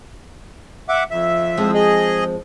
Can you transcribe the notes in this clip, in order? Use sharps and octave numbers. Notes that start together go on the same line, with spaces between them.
E5 F#5 D6
F2 E5
F3 G#3 C4
G#4 D#5